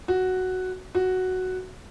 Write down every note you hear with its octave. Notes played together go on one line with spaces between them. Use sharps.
F#4
F#4